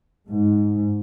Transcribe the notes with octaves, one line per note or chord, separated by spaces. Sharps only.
G#2